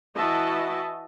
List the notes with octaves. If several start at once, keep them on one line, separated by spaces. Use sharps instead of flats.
E3 E4 F#4 D#5 E5 A5